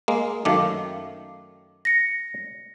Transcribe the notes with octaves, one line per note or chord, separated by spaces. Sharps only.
G#3 A#3
F#2 D#3 A3 F5 D6
A#6 C#7